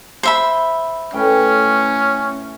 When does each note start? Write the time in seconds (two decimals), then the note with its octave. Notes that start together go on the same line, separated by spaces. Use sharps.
0.23 C5 E5 B5
1.13 A2 C#4 B4 G5